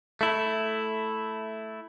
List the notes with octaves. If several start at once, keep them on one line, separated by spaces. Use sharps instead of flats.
A3 E4